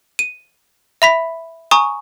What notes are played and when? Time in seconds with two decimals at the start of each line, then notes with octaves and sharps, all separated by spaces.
0.19 D#7
1.02 E5 B5 B6
1.71 G#5 A#5 C#6 D#6